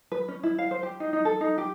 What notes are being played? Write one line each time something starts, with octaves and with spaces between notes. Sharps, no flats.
B4
C#4
E4
F5
C5
G4
D#4
D#4
A4
D#4
G4